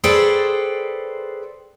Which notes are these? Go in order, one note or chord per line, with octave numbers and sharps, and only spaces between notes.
G#4 A4 B4 C5 D5 G5